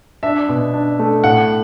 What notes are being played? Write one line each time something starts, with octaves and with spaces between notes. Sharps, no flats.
D4 E5
B2
D4
A3
A2 F#5